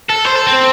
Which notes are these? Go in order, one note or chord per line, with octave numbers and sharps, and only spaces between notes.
A4
C5
A4
C4